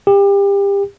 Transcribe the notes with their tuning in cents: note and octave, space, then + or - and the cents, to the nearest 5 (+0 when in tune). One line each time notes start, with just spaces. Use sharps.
G4 +30